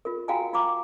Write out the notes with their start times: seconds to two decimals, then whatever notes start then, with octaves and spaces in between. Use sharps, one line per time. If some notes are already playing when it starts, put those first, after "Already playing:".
0.05 F4 A#4
0.28 F4 F#4 F5 G5 G#5 A#5
0.53 F4 F5 A#5 D6